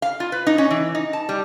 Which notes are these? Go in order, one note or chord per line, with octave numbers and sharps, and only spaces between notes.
F5
F4
B4
D#4
C#4
E3
D#4
A5
G3